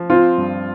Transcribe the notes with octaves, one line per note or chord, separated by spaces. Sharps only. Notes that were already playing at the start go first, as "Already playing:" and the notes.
Already playing: F3
C4 F4
G2